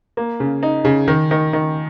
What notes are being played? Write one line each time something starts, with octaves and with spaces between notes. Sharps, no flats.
A#3
C#3
D#4
C#3
D#3
D#3
D#3